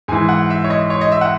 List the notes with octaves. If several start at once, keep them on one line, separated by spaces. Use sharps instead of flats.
G#2 E3 G#5
F#5
E5
C#5
D#5
C#5
D#5
E5
F#5